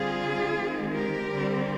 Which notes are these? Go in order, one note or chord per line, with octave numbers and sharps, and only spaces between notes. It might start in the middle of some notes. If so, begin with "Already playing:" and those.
Already playing: D3 G3 C4 F4 G#4
D#3 G#3 C4
G4 A#4
D3 G3 C4